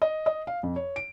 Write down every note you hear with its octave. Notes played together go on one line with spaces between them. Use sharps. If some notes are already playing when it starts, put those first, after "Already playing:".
D#5
D#5
F5
F2
C#5
D7